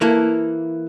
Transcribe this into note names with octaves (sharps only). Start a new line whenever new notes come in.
E3 A#3 E4 A4